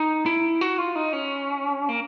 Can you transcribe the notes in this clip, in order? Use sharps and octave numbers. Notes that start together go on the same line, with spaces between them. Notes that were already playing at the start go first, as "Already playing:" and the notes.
Already playing: D#4
E4
F#4
F4
D#4
C#4
A#3